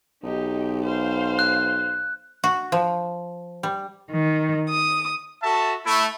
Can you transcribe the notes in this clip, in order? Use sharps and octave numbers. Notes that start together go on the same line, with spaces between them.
B1 D#4 G4
C5 F5
F#6
F#4
F3
G3
D#3
D#6
F#4 A4 E5 A5
A3 E4